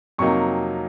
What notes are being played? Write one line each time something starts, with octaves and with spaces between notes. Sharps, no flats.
F2 C3 F#3 A#3 D#4 C#6